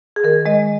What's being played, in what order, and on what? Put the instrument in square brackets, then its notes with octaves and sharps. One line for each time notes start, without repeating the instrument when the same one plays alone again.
[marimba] G#4
D#3 A#4
G#3 D#5